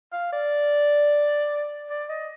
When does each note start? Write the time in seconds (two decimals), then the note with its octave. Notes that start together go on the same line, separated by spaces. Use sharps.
0.13 F5
0.33 D5
1.90 D5
2.10 D#5